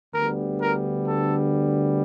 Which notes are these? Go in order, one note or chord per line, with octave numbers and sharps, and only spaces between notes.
D2 D3 G3 B3 A#4
A#4
A4